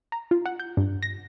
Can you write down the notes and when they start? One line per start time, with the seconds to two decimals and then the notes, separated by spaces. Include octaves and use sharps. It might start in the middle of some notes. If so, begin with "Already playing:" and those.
0.12 A#5
0.31 F4
0.46 F#5
0.60 G6
0.77 G2
1.03 A#6